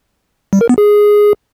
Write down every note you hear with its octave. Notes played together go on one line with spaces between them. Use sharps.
G3
A#4
B3
G#4